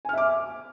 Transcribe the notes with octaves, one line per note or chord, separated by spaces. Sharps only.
E5 G#5 D6 F6